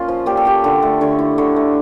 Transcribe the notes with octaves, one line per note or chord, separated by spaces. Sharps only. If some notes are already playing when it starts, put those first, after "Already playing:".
Already playing: A#2 C#4 F4
F3
A#2 G4
A4
C#4 G4
D3 A4
A3
D3 C#5
E4
D3 C#5
A3